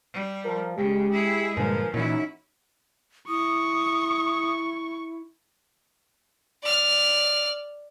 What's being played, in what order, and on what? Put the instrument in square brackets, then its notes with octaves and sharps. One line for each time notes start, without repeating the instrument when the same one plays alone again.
[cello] G3
[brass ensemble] F3 [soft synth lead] A#4
[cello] C#3 [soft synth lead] G#3 [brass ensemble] G4
[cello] E4 G#4
[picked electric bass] G2 A#2 D3 [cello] F3 [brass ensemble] A#4 B4 G#5
[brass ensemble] F#2 [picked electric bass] A#2 E3 [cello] C#4 E4 [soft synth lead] D#4
[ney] E4 [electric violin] C#6 [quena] D#6
[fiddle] D5 F6